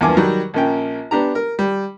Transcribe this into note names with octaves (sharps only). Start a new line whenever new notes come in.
E2 G2 F3 A#3 G#5 D6
D#3 F#3 G3
A#1 A#3 C#4 G5
B3 D4 G4 A#5
A#4
G3